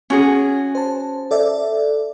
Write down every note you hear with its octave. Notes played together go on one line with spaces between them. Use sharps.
C#4 F#4 G#4
C5 A5
A4 D5 E5